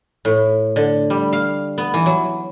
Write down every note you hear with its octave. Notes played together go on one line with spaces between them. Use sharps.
A2
D3
G3
F5
B3
E3
F#3